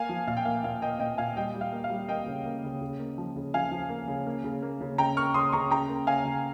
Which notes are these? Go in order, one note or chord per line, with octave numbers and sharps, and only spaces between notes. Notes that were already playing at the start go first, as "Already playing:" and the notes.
Already playing: A#3 F5 G#5
F3
A#2 F5
G5
A#3 F5
A#2 F5
A#3 D#5 G5
A#2 D#5 G5
A#2 F5 G#5
G3 D#5 G5
G3
F5
A#3
F5
G3
A#3 D#5 G5
C#3
A#3
C#3
C#3
A#3
F3
C#3
F3 F5 G#5
F3
A#3
C#3
A#3
C#3
A#3
C#3
C#3 G5 A#5
A#3 C#6 F6
C#3 C6 D#6
C#3 A#5 C#6
C#3 G5 A#5
A#3
C#3 F5 G#5
C#3